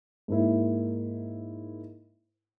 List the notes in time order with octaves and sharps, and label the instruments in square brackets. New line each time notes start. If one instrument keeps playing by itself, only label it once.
[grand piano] G#2 A#3 E4